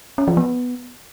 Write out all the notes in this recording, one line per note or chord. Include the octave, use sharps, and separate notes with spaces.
C#4
F3
B3